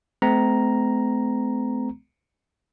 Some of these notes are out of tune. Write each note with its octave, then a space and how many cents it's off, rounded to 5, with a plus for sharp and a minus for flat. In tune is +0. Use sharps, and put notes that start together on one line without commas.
A3 -35 C4 -40 A#5 +0